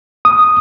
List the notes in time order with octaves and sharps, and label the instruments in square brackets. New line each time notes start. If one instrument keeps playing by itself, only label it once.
[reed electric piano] D#6